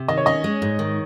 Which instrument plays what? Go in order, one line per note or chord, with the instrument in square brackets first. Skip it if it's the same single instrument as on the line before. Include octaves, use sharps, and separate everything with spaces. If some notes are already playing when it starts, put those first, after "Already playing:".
Already playing: [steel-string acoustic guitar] C3
[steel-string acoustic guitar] D#3 [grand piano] D#5
[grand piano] C#5
[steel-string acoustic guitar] C#4 [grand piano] D#5
[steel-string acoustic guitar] G#3
G#2
D#3